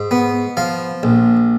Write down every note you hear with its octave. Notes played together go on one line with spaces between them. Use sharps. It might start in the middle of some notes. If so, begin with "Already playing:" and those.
Already playing: G#2
B3
F3 F5
A#1